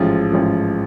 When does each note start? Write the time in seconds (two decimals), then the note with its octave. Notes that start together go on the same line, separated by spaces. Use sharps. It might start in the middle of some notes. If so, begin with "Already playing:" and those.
Already playing: A1 G#2 F3
0.32 A1 G#2 F3